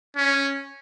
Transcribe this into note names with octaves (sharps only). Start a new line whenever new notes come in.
C#4